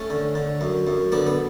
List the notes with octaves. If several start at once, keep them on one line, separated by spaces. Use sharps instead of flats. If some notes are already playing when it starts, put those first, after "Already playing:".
Already playing: A3 C#4
D3
D3
F#2
F#2
D3 B3 D4
B3